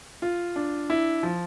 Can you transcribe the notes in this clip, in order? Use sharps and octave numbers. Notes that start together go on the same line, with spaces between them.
F4
D4
E4
F3